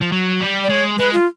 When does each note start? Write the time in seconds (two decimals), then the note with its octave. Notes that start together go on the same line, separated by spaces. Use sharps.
0.01 F3
0.12 F#3
0.40 G3
0.64 D5
0.69 G#3 C#5
0.98 G#3 B4
1.13 F4